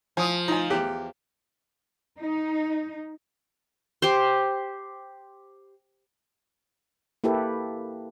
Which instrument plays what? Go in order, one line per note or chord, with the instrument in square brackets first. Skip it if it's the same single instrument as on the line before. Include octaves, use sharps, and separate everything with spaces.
[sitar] F3 [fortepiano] G#5 D#6
[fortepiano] D#4 F4 G#5
E2 G4
[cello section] D#4
[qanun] G4 C5
[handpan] A#3 E4 G4 A4 B4